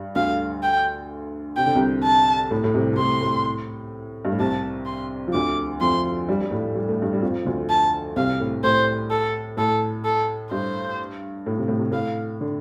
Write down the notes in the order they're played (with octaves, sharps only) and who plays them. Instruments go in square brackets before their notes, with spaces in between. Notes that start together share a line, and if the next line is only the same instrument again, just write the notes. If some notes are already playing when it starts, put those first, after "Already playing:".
Already playing: [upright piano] G2 G3
[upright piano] D2 D3 [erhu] F5
[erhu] G5
[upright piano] C3 [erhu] G5
[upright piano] D3
C2 C3
[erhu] A5
[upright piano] A2
A2
C2 C3
C3
[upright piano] A2 [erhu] C6
[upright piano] A2
G2
A2
[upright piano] C2 C3 [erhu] A5
[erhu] C6
[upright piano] F3
[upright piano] D2 D3 [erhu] D6
[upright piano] F2 F3 [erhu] C6
[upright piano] G2 G3
G3
A2 A3
G3
A3
G2 G3
G3
F2 F3
D2 D3
[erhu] A5
[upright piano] C2 C3 [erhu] F5
[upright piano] A2
[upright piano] A2 [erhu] C5
[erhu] A4
[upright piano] A2 [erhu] A4
[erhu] A4
[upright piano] G2 [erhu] C5
[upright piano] A2
C3
A2
C3
[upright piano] A2 [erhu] F5
[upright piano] D3